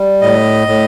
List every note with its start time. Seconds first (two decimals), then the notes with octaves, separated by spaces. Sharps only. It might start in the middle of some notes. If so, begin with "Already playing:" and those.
Already playing: G3
0.21 A2 D#5
0.68 A2